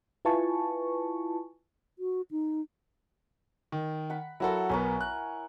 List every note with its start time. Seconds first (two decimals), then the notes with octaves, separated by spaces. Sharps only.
0.25 E4 F4 B4 G#5 A5 C#6
1.99 F#4
2.31 D#4
3.72 D#3
4.10 F#5 B5
4.40 F#3 E4 F#4 A4 A#4 F#5
4.69 B1 B3 A#4 C#5 G#5
5.01 F#6